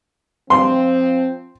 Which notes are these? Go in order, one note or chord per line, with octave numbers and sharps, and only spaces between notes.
F3 C4 C6